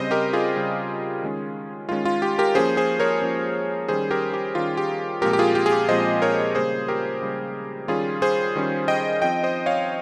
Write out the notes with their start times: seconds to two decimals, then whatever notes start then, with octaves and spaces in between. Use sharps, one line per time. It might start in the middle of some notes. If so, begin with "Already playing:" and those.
Already playing: C#3 G3 C4 C5 D#5
0.11 G4 A#4
0.33 F4 G#4
0.56 C#3 G3 C4
1.22 D#3 G#3 C#4
1.89 D#3 G#3 C#4 F4
2.05 F4
2.22 G4
2.39 G4 A#4
2.55 F3 A#3 C#4 G#4 C5
2.77 G#4 C5
3.00 A#4 C#5
3.22 F3 A#3 C#4
3.88 D#3 G3 C#4 G#4 C5
4.11 G4 A#4
4.34 G4
4.55 D#3 G3 C#4 F4
4.77 G4
5.22 A#2 F3 G#3 C4 G4 A#4
5.33 G4
5.39 F4 G#4
5.55 G4
5.66 G#4
5.72 G4
5.88 A#2 F3 G#3 C4 C5 D#5
6.22 A#4 C#5
6.55 C#3 G3 A#3 G#4 C5
6.88 G4 A#4
7.22 C#3 G3 A#3
7.88 D#3 G3 C#4 F4 G#4
8.22 G#4 C5
8.55 D#3 G3 C#4
8.88 D#5 G5
9.22 F3 C4 D#5 G5
9.43 C5 D#5
9.66 C#5 F5